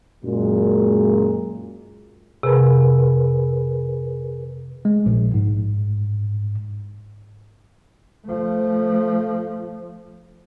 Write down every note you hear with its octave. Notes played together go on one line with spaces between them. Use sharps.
F#2 A#2 G#3
F2 C3 G#4 A#4 B4
G#3
A#1
G#2
F3 A3